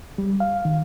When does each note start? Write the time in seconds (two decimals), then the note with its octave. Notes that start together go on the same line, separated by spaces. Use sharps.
0.18 G3
0.40 F5
0.65 D#3